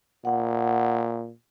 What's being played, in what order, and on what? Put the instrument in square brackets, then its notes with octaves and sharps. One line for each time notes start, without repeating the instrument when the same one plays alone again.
[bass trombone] A#2 [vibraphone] F#5